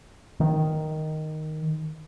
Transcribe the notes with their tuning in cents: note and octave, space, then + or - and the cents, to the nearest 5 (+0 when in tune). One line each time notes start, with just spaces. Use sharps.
D#3 -5